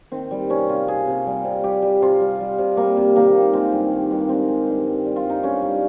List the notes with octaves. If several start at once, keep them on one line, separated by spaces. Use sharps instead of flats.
D#3 C4
G3
C3 C#4
C3 F4
C3 G#4
C3
G3
C3
G3 G4
G3
C3 F4
G3
G3
C3
G3 A#3
C3
D#3 A#3
D#3
G#3 C4
G2
D#3
G2
G#3 C4
G#3
G2
G2
G3
F4
G2
D#4
G2 C#4
G3